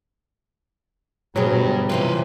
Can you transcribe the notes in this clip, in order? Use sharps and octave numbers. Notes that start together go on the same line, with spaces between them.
D2 G2 B2 F#3 G4 G#4
C3 E3 F3 B4 C5